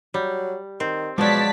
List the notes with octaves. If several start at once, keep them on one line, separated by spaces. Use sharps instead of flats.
F#3 G3
D#3 C4
B2 F3 F#3 G#3 D5 A5 B6